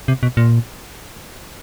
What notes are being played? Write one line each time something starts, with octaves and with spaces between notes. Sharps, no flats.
C3
B2
A#2